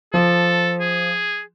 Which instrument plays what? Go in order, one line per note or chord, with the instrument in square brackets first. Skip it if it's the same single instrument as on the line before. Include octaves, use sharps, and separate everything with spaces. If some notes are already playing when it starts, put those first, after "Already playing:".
[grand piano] F3 [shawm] A4
[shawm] G#4